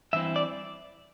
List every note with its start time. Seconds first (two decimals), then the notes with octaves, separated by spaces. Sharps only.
0.13 G2 E3 C4 E4 E5
0.36 D5